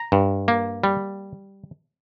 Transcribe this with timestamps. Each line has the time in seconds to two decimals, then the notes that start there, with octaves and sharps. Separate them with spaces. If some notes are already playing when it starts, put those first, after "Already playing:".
Already playing: A#5
0.12 G2
0.48 A#3
0.84 G3